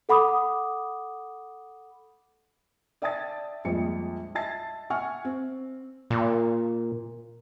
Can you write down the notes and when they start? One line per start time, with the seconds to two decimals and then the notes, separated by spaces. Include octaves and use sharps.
0.09 A4 F#5 B5 D6 D#6
3.02 D5 E5 G5 A5 D#6 A6
3.65 A#1 F2 G3 G#3 C#7
4.35 D#5 E5 A5 A6 C7
4.90 E5 F#5 G#5 C#6 F6
5.25 C4
6.10 A#2